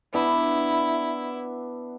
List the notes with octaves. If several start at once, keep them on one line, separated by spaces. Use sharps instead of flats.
B3 D4 E4 E5